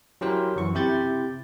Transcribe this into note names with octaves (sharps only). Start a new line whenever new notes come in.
F#3 C#4 E4 G4 A#4 C5
F#2 E3 C#6
C3 E4 G4 G6 A6